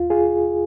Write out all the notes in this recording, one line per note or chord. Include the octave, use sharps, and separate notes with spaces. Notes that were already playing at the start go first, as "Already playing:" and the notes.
Already playing: D#2 F4
F4 G#4